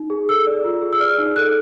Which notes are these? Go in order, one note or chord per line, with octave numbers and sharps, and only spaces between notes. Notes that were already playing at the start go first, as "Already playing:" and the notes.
Already playing: D#4
G#4
A4 E6
D5
F4
G#4
E6
D5 F6
D#4
A4 F#6